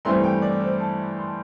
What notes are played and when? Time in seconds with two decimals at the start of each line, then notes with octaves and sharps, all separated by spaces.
0.05 G2 E3 A3 C4 E4 C6
0.24 G5
0.42 D5
0.61 C5
0.80 A5
1.17 C6
1.26 A5